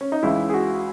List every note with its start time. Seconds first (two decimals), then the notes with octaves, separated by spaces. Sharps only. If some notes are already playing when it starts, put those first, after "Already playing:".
0.01 C#4
0.12 D#4
0.23 C#2 C#3 E3 E4
0.49 G#4
0.54 F#4